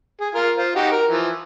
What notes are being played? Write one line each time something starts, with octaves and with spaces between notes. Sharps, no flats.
G#4
F4 A#4
F4 C5
D#4 F#4 G4
A#4
E3 F3